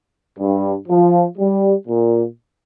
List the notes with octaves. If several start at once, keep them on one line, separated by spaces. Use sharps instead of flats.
G2
F3
G3
A#2